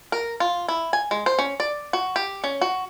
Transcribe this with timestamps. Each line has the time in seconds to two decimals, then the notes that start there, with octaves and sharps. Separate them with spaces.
0.12 A#4
0.40 F4
0.68 E4
0.93 G#5
1.11 G#3
1.26 C5
1.39 C#4
1.60 D5
1.93 F#4
2.16 G4
2.44 C#4
2.61 F#4